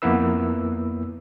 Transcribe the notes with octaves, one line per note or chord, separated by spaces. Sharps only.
F2 A#3 B3 E4 B4 E6